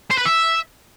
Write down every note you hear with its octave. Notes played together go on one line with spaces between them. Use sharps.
C5
B4
E5